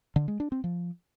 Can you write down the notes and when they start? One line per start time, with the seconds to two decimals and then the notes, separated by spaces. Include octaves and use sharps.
0.16 D3
0.28 G#3
0.40 D4
0.52 C4
0.64 F3